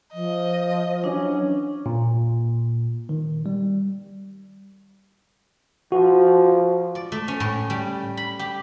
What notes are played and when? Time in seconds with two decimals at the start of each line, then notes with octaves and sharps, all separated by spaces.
0.14 F3 D#5
1.04 E3 F#3 C#4 D4
1.86 A#2
3.09 D#3
3.46 G3
5.92 F3 F#4
6.95 D5
7.12 A3
7.28 C#4
7.40 A2
7.70 G3
8.17 B5
8.39 G4